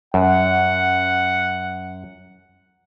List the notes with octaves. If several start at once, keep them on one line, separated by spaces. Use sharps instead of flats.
F#2 F#5